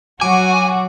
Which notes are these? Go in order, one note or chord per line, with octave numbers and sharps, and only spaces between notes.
F#3 F#4 G#5 D6